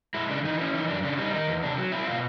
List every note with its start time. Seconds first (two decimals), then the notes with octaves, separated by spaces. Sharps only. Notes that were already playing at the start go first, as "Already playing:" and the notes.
0.14 G#3 E4
0.29 C#3 D4
0.44 E3 D#4
0.59 C#4 E4
0.74 E3 D#4
0.88 F#2 D4
1.03 C#3 D4
1.18 G3 D#4
1.33 D#3 D#4
1.48 E2
1.63 C3 D4
1.78 F#3
1.92 C4 E4
2.07 B2 F4